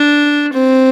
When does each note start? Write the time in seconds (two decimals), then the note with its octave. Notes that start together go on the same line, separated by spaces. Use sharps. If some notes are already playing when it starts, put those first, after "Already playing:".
Already playing: D4
0.53 C4